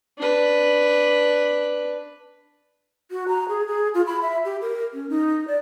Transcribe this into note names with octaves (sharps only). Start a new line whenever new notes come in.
D4 B4
F#4
A#5
G#4
G#4
F4
B5
E5
G4
A#4
C#4
D#4
D5